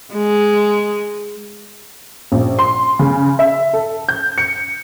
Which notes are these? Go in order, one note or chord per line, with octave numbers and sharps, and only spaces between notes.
G#3
A#1
C6
C#3
E5
A4
G6
C#7